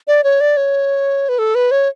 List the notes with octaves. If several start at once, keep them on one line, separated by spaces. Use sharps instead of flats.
D5
C#5
D5
C#5
B4
A4
B4
C#5